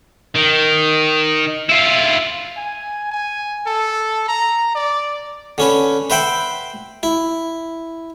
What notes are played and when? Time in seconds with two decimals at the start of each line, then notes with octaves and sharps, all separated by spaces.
0.36 D#3
1.69 E4 F4
2.57 G#5
3.11 G#5
3.67 A4
4.28 A#5
4.75 D5
5.58 D3 C#4 B4
6.10 B4 C5 E5 F#5 G5 B5
7.03 E4